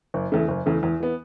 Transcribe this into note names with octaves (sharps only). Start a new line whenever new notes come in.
F#1
E2 C#3 A3
F#1
E2 C#3 A3
E2
E3 B3